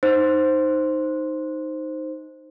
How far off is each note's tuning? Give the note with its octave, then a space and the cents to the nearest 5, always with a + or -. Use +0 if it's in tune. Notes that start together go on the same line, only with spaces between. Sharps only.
D#4 +0 C5 +0